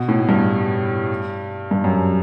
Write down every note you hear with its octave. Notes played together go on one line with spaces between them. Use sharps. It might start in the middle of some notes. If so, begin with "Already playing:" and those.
Already playing: B2
A2
G2
G2
F#2